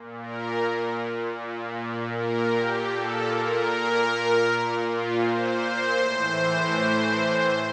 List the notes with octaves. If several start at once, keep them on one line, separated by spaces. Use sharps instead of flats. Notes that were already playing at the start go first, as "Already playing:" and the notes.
Already playing: A#2
A#4
A#2
A#4
G4
A#2 A4
A#4
A#2
F4
C5
A2 E3